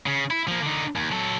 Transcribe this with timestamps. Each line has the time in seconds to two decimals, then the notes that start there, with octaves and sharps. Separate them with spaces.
0.06 C#3
0.31 E4
0.48 F3 A#3
0.62 D3 D#4
0.96 D#2
1.11 F#3 A4